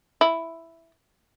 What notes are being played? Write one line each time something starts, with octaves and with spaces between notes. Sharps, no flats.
E4